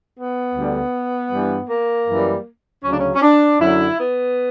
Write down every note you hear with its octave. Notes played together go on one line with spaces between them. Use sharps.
B3
D2 D3 G3
G2 E3 G3
A#3
F#2 E3 G3
D2 C#3 F#3 C#4
D4
C#4
C#4
D4
F#2 D3 F#3 E4
B3